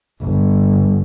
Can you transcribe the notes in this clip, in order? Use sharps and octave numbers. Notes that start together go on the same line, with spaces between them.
G1